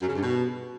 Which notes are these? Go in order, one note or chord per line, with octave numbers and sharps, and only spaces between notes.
F#2
C#3
G2
B2